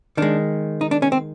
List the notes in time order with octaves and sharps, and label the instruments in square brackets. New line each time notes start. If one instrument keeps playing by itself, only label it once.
[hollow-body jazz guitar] D#3 G#3 D4
D#4
D4
C#4
C4